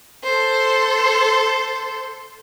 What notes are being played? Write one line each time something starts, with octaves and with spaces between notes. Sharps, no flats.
A4 C5